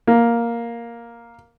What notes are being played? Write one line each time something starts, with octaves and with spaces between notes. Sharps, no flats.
A#3